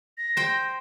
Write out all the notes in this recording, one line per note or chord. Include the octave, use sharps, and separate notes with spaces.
A#6
C5 G5